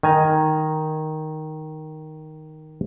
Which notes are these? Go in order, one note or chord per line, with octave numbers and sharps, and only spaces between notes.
D#3 G#5 A#5